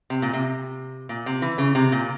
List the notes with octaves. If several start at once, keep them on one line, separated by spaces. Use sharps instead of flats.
C3
A#2
C3
A#2
C3
E3
C#3
C3
A#2